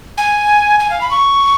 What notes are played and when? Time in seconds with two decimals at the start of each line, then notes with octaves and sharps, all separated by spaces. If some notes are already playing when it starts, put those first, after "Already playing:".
0.18 G#5
0.80 G#5
0.90 F5
1.01 B5
1.11 C#6